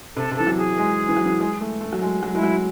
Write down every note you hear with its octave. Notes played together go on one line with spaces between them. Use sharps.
C3 A4
C3
E3 A4
F#3
G#4
G#3
E3
F#3
E3
G#3
A3
A3
F#3
G#3
F#3
G#3 E4
F#3